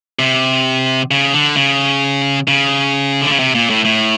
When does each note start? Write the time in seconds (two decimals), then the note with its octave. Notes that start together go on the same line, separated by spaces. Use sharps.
0.19 C3
1.11 C#3
1.34 D3
1.56 C#3
2.48 C#3
3.22 D3
3.30 C#3
3.39 C3
3.55 A#2
3.70 A2
3.85 A2